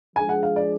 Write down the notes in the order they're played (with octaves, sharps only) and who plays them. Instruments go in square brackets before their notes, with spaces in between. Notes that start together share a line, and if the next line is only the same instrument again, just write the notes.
[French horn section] F3 G#3 D4 G#4 [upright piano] G#5
[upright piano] F#5
F5
D5